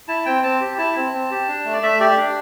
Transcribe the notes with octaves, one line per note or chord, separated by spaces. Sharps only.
E4 A5
C4 G5
C4 A5
G4
E4 A5
C4
C4
G4
D4
A3
D5
A3 E5
G4 D5
D4